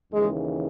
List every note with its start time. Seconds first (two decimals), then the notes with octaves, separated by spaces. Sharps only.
0.13 D#2 C#3 E3 G#3